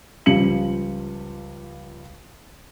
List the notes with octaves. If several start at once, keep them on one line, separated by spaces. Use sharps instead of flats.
C#2 F3 G3 C#7 F#7